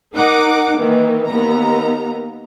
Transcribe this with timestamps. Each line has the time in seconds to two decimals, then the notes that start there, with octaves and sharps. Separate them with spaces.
0.15 D#4 A#4 F#5 D6
0.79 D#3 E3 A#3
1.27 D#2 B3 A#5